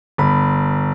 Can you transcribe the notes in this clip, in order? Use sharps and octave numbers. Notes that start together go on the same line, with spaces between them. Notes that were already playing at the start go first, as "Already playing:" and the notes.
G1 B5